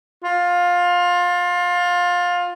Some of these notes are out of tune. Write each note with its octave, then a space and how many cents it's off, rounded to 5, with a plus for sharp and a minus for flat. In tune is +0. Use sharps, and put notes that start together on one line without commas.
F4 +20